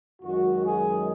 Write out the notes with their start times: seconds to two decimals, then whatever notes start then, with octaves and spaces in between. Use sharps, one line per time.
0.22 F#2 D#3 G#3 F#4
0.64 G#4